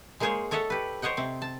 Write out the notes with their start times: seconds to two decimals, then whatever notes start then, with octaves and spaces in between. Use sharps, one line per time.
0.20 G#3 A#3 D#4 G#4 C5 C#5
0.51 A4 C#5 D#5 E5 F#5 A5
0.70 G4 B4
1.02 C5 C#5 D#5 F#5 G5
1.17 C3 C4
1.42 A5